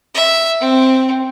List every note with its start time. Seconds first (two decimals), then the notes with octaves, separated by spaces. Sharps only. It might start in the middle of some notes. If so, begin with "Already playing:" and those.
0.14 E5
0.61 C4